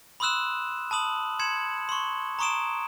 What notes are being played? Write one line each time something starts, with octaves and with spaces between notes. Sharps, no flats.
B5 C6 D#6 E6 F#6 E7
A5 B5 D#6 F#7
C6 G#6 C#7 E7
C6 C#6
A#5 C6 C#6 D#6 D7 E7